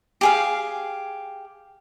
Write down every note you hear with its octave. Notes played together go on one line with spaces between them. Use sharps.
G4 G#4 F5